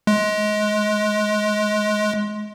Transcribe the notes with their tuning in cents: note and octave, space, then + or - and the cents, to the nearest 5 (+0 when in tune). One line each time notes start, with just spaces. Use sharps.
G#3 +25